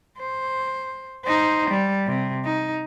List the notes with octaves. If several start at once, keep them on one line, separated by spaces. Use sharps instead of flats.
C5
D#4 C5
G3
C3
D#4